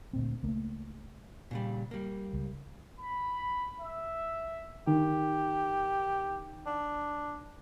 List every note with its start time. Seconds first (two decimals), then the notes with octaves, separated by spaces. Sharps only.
0.13 D2 A#2 C4
0.43 C#2 A3 A#3
1.51 A#2 C#3 G3
1.91 G3 A#3
2.33 C#2
2.99 B5
3.79 E5
4.87 D#3 G4
6.66 D4